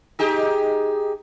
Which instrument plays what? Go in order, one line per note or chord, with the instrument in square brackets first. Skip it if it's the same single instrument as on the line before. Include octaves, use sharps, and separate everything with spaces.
[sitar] D#4 G4 G#4